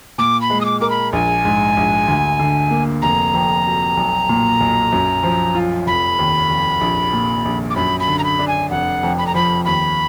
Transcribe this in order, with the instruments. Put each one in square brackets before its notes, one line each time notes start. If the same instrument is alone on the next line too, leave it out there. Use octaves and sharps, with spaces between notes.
[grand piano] A#2 [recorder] D6
[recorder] B5
[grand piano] G#3
[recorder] D#6
D6
[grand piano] A#4 [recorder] D6
[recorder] B5
[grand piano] A#1 [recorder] G#5
[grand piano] G#2
A#1
D2
D3
A#3
[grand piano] F1 [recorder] A#5
[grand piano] F2
F#3
B1
A#2
B1
F#2
F3
F4
[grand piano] F1 [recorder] B5
[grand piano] D#2
F1
A#1
A#2
A#1
[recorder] D6
[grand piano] F#2 [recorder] B5
[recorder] B5
[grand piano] D3
[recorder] A#5
B5
[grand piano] D4
[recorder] G#5
[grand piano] F1 [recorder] F#5
[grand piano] F2
[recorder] B5
A#5
[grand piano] F3 [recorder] B5
[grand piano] D#2 [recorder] B5